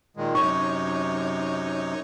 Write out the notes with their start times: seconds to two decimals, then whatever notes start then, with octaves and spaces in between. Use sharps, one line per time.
0.17 A#2 D#3 G#3
0.35 F#2 C3 D#4 C#5 C#6